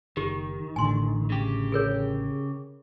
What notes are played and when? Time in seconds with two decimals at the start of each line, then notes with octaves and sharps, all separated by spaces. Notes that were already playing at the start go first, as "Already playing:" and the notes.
0.17 F#1 D#3 G4
0.76 A1 A2 D3 G#5 C6
1.30 C#3 G4
1.72 G#4 A#4 C#5